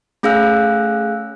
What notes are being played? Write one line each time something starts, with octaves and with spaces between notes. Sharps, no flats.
A3 C#4 G#4 F5 E6 F#6